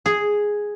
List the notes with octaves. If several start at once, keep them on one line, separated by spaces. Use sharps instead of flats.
G#4